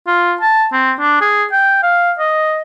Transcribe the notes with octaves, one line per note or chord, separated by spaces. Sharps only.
F4
A5
C4
D4
G#4
G5
F5
D#5